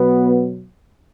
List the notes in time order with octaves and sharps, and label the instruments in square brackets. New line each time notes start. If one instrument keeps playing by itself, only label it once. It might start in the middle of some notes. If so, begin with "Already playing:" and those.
Already playing: [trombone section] B2 F#3 B3